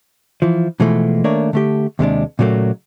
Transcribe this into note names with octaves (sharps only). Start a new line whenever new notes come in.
E3 F3
B2 E3 F3 G#3 A3
D#3 A3 A#3 D4 A#4 C#5
D3 A3 G4
D#2 C3 G#3 D4
A#2 C#3 F#3 A3 A#3